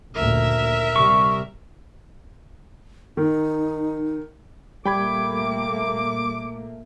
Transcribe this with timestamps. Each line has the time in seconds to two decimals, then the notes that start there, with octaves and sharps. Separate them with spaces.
0.15 F#1 D2 A#2 A#4 E5
0.96 C3 G3 C#6
3.17 D#3 D#4
4.86 A#2 G3 A3 A#3 G5 B5 D6 G#6